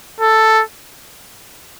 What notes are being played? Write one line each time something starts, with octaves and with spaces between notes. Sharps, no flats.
A4